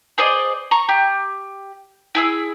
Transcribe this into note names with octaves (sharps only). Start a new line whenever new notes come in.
G#4 C5 D5 D#5
A#5 C#6
G4
E4 G#4 E6